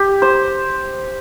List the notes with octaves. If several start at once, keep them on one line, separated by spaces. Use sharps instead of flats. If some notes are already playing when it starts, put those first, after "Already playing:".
Already playing: G4
C5